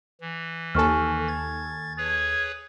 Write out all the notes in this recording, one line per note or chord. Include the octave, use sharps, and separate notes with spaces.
E3
D#2 A4 G#5 C#6 F6
G#6 A6
G#4 B4 C#5 G#6